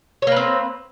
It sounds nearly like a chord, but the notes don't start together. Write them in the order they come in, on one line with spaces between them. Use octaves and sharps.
C#5 A#3 B4 C4